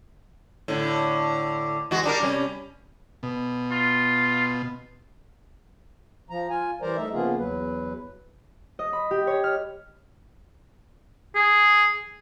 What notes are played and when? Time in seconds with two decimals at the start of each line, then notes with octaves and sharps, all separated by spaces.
0.68 A2 D3
1.91 E2 G#3 F#4
2.04 G3 D4 A#4
2.22 C3 G3 C#4
3.23 B2
3.71 F4
6.30 F3 A#5
6.50 F4 G#5
6.82 E3 G3 A#4 C5 D5 A#5
6.97 A3 D#4 E5
7.13 C#3 F3 A#3 B3 F4 G#4
7.38 E2 F#3 B4
8.79 D#5
8.93 B5
9.11 G4
9.27 C#5
9.44 F6
11.35 G#4